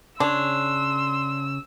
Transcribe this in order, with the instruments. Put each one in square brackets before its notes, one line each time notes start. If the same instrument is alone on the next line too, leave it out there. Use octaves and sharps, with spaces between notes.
[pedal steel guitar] C#3 C#5 [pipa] D4 [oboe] C6 [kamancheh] E6